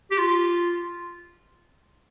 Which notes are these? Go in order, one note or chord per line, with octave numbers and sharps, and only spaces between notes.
G4
F4